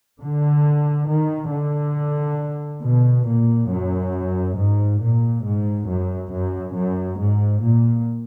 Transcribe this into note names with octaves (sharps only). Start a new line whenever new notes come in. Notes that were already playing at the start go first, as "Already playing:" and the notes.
D3
D#3
D3
B2
A#2
F#2
G#2
A#2
G#2
F#2
F#2
F#2
G#2
A#2